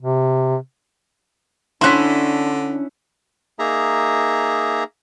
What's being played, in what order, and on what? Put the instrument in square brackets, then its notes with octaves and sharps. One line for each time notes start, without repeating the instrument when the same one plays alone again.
[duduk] C3
[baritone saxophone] D3 [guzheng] C#4 E4 [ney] D4 [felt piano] C6 F#6 B6
[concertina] A#3 D#4 G#4 E5 A#5